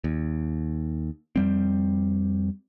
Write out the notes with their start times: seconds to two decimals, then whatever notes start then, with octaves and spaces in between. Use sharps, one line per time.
0.04 D#2
1.36 F2 G3 C4